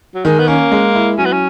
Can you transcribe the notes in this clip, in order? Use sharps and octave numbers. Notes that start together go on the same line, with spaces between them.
F#3
D#3 G#3
B3
A#3 C#4
G#3
E4
F#3 C#4
B3
C#4